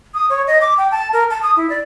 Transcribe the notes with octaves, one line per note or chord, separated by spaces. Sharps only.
D#6
C#5
D#5
D6
G5
A5
A#4
A5
D#6
E4
D5